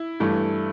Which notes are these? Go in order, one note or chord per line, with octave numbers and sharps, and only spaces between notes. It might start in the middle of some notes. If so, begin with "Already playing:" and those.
Already playing: E4
G2 E3 A3